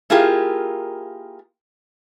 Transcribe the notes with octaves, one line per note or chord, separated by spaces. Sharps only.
A#3 E4 F4 G4 G#4 A#4